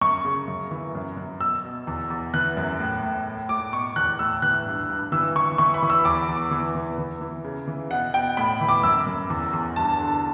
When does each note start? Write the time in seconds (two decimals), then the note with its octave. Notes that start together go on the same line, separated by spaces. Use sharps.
0.01 F#2 C#6
0.25 C#3
0.48 F#2
0.71 E3
0.95 F#2
1.17 F#2
1.40 B2 E6
1.65 B2
1.87 E2
2.10 E2
2.34 E3 F#6
2.57 F#2
2.80 A2
3.03 A2
3.26 A2
3.49 A2 D6
3.73 B2 C#6
3.96 E2 F#6
4.19 A2 E6
4.42 E3 F#6
4.66 G2
4.90 G2
5.12 E3 E6
5.35 E3 C#6
5.58 E3 C#6
5.74 B5
5.82 E3
5.90 E6
6.05 E2 D6
6.28 E2
6.51 E3
6.75 E3
6.98 E3
7.21 E3
7.44 C#3
7.68 E3
7.91 B2 F#5
8.14 B2 G5
8.37 A2 B5
8.61 E3
8.69 D6
8.83 F#2 E6
9.07 F#2
9.30 E2
9.53 E2
9.76 G2 A5
10.00 D3